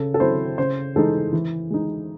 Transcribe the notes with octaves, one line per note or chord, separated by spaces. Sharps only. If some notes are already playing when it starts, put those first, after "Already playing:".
Already playing: C#3 A4
A4
F#3 C4 E4 C5
C#3 C5
E3 G#3 D#4 A4
E3
G#3 D#4